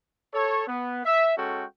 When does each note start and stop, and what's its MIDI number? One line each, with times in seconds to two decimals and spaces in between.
0.33 0.65 69
0.33 0.65 73
0.68 1.01 59
1.05 1.34 76
1.37 1.65 56
1.37 1.65 61
1.37 1.65 66
1.37 1.65 69
1.37 1.65 79